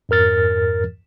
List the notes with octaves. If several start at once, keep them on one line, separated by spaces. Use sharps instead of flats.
F2 G#2 A#4 F6 A6